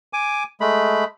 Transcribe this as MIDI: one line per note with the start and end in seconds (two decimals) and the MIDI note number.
0.13 0.44 80
0.13 0.44 86
0.61 1.04 56
0.61 1.04 57
0.61 1.04 83